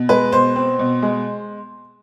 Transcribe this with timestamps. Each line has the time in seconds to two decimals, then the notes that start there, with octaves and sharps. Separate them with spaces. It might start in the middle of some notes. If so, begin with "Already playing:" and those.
Already playing: B2
0.09 G#3 B4
0.32 B2 C5
0.56 C4
0.79 B2
1.02 G#3